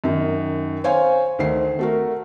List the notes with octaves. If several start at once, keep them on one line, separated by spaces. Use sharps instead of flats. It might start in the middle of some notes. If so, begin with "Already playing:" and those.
F#2 D#3
C5 C#5 F5 G#5
D2 D#3 C5 C7
A3 F#4 A#4